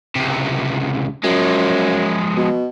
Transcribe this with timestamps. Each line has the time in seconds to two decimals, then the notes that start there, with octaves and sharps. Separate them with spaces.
0.16 C#2 C3
1.24 F#2 F3 G#3
2.37 B2